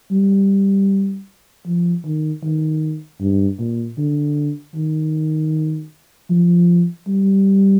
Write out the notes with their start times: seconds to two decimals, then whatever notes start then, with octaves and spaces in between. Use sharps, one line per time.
0.11 G3
1.66 F3
2.05 D#3
2.44 D#3
3.20 G2
3.59 A#2
3.98 D3
4.75 D#3
6.30 F3
7.08 G3